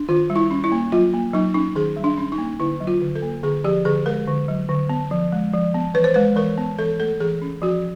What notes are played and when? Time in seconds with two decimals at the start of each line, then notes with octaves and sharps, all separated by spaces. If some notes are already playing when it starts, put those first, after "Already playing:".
Already playing: D4
0.09 D#3 F4
0.30 G3
0.36 E4
0.51 C#4
0.64 E4
0.72 A#3
0.92 F#3 F4
1.13 A#3
1.34 F#3 D#4
1.54 C#4 D#4
1.76 D#3 G#4
1.96 G3
2.04 D4
2.18 C#4
2.32 D#4
2.38 A#3
2.60 D3 E4
2.80 F#3
2.87 F4
3.02 D3
3.15 A4
3.22 A#3
3.43 D3 G#4
3.64 F3 G4
3.85 D3 G#4
4.06 G#3 A#4
4.28 D3
4.48 F#3
4.69 D3
4.89 B3
5.11 F3
5.33 G#3
5.53 F3
5.74 B3
5.94 E3 B4
6.04 C5
6.14 G#3 B4
6.36 E3 A#4
6.57 B3
6.79 E3 A4
7.00 A3 A4
7.20 E3 G#4
7.42 C#4
7.62 F3 F#4